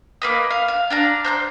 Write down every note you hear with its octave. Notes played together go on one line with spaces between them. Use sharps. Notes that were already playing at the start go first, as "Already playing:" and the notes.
A#3 B4 D#5
F5
F5
D4 F5 A#5
C5 F#6 G6